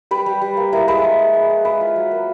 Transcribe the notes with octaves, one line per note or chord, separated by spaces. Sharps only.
G3 B4
G3
G3
A#3
E4 A#4
G#3 B4
G#3
G#3
G#3
G#3
G#3 B4
F4
F#3
A#3